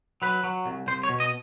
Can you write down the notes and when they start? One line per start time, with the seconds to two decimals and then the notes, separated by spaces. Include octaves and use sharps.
0.22 F#3 B4
0.44 F#3
0.66 C2
0.87 C2 C5
1.03 C#5
1.09 B2
1.20 D#5